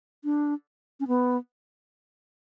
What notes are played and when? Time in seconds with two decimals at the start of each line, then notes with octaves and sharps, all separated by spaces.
0.24 D4
1.00 C#4
1.08 B3